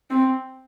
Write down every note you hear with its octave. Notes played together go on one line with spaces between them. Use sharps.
C4